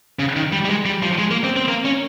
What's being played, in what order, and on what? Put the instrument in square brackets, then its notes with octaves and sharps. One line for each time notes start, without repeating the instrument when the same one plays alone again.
[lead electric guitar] C#3
D#3
G3
G3
G#3
G3
F3
G#3
A#3
C4
C4
A#3
C#4